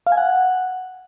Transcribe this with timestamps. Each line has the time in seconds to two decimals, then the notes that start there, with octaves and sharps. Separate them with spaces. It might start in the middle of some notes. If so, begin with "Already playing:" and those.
0.07 F5
0.12 G#5
0.17 F#5